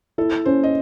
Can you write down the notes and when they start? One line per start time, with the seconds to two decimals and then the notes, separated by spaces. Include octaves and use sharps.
0.18 E4 A4
0.45 C#4 C5
0.64 D#5